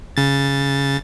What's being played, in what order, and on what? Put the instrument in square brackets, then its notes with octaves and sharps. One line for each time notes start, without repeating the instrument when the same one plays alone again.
[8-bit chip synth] C#3 A6